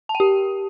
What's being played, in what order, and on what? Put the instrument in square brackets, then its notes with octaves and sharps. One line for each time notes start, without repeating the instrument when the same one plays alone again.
[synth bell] A5
G5
G4